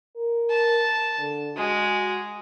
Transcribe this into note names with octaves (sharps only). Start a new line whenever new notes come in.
A#4
A5
D3
G#3 F#4